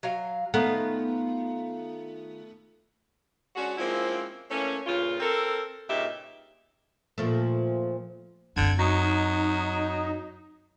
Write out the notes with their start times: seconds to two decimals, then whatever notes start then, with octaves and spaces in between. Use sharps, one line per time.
0.03 F#3 F5
0.54 D#3 A3 B3 F4
3.55 G#3 C#4 D4 F#4
3.77 F3 G#3 A#3 C4 C#4 E4
4.51 E3 A3 A#3 C#4
4.86 G2 A#2 C#3 C#4 F4
5.20 C4 A4 A#4
5.89 G2 A#2 C#3 D#4 G4 E5
7.18 A#2 F3 A3
8.57 F#2 D3 C4 G#6
8.79 F#3 D#4